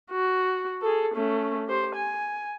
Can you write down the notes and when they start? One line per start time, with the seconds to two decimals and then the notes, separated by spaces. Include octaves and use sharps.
0.11 F#4
0.82 G#4 A4
1.15 A3 C#4
1.67 G4 C5
1.95 G#5